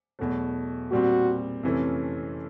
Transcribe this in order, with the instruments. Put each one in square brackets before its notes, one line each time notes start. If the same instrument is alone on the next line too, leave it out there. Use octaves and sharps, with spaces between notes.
[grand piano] E2 B2 F#3 A3
[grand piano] A#2 G3 C4 [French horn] F#4
[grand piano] F2 C3 E3 A3 C#4